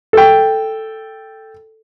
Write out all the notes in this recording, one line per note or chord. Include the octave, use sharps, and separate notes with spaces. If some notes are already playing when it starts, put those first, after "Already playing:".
A4 G5